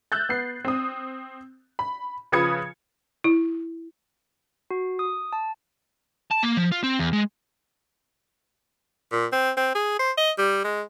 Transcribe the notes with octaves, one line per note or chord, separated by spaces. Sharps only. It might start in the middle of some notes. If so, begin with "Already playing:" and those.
E6 F#6 G6 A6
B3 C7
C4 D#6
B5
C#3 F3 B4 D#6 G#6 C#7
E4
F#4
D#6
A5
A5
A#3
F3
F4
C4
E2
G#3
A#2
C4
C4
G#4
C5
D#5
G3
G#3